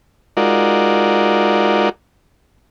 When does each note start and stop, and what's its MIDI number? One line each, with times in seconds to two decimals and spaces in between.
0.37 1.89 56
0.37 1.89 63
0.37 1.89 65
0.37 1.89 66
0.37 1.89 70
0.37 1.89 74